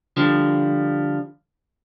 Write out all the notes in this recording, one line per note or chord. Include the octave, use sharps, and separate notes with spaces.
D3 F3 G3